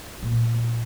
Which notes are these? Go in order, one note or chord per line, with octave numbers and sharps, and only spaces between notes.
A#2